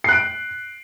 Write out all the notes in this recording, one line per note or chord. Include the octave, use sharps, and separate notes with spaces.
F#6 C7 D7